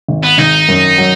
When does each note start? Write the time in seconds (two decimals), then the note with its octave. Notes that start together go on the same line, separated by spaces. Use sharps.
0.08 G#1
0.23 B3
0.38 G#1 D#4
0.68 F#2
0.98 F#3